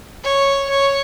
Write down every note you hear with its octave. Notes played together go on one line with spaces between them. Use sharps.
C#5
C#5